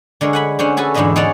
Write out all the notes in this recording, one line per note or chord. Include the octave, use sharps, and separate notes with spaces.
D3 G#3 A#4 C#5
F#5 G#5 B5
D3 C#4 C5 F#5
F#4 G#4 A4 B4 G#5
E2 G#2 D3 E4 D#5 E5
D#4 G#4 C#5 D5 F#5 A5